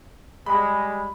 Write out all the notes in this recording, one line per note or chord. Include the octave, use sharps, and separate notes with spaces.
G3 G#3 B5